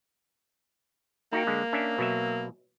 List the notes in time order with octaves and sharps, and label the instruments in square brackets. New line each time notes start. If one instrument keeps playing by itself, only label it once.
[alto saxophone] A#3 [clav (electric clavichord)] D#4 F#4 G5
[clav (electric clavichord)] D3 G#3
C#4 D4 E5
B2 F#3 E5